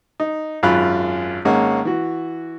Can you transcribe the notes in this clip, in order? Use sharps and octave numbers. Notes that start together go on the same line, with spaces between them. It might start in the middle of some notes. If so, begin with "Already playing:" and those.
D#4
G#1 F#2 F4 F5 B5 F#6
G#1 G#3 A#3 C#4 F#5
E3 F#4